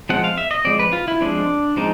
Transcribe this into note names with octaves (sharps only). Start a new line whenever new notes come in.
F3 G#3 C4 F#5
F5
E5
D#5
F3 G#3 C4 D5
B4
F4
E4
F3 G#3 C4 D4
F3 G#3 C4 D#4